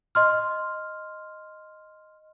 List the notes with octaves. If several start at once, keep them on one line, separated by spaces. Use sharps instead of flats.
D#5 C6 F6